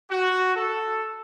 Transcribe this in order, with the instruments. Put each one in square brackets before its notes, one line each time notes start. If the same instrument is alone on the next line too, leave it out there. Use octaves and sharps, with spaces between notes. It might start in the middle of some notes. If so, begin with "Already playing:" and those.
[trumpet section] F#4
A4